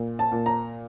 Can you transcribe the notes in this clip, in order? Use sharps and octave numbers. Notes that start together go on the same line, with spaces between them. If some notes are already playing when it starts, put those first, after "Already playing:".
Already playing: A#2
A5
A#2
A#5